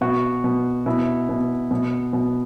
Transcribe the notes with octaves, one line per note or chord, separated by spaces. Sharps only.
B2 F#4
B2
B2 E4
B2
B2
B2